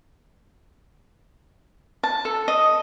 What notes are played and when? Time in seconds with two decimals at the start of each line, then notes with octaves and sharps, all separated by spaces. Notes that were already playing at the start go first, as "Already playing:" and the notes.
2.03 A5
2.25 A4
2.48 D#5